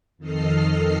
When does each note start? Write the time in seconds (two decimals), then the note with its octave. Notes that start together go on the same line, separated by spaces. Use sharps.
0.18 F2 D#3 A4 D#5 F6 C7